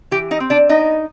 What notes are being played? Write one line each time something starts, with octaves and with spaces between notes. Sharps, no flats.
E3 G4 G5
D#4 D#5
C4
D4 D5
B3 D#4 D#5